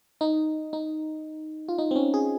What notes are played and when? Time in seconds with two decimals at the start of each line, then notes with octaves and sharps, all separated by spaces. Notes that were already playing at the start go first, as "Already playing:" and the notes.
0.21 D#4
0.73 D#4
1.68 F4
1.78 D#4
1.91 C4
1.96 C#4
2.14 G#4